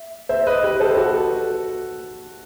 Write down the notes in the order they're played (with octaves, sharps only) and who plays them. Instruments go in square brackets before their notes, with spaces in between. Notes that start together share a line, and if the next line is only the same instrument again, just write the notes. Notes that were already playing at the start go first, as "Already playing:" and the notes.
Already playing: [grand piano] E5
C5 E5
B4 D#5
G4 B4
A4 C5
F#4 A4